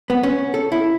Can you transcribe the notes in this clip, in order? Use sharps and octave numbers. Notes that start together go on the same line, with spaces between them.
B3
C#4
A4
E4